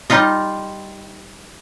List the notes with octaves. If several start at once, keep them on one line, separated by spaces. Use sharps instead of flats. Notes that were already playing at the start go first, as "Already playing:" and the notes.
G3 D#4 F4 D#5